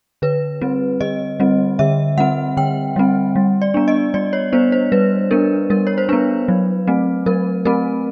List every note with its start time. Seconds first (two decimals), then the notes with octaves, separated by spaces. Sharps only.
0.22 D3 B4
0.61 G3 C4
1.01 D3 D#5
1.40 G3 C4
1.79 D3 E5
2.18 G3 C4 F#5
2.57 D3 G5
2.96 G3 C4
3.36 G3
3.61 D5
3.74 B3 D4
3.88 D#5
4.14 G3 D5
4.33 C#5
4.52 B3 D4 C5
4.72 C5
4.92 G3 B4
5.31 B3 D4 A#4
5.70 G3 A#4
5.87 C#5
5.98 C5
6.09 B3 D4 B4
6.48 F#3
6.87 A3 C4
7.26 F#3 A#4
7.65 A3 C4 A#4